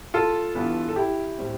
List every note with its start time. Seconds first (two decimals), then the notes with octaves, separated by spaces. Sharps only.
0.14 F4 A4
0.55 G2 E3 B3
0.89 A4
0.96 E4 G4
1.38 A2 G3 C4